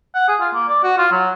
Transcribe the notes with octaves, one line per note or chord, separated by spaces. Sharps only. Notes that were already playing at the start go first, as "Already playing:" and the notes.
F#5
G#4
F4
A#3
D5
F#4
F4
F#3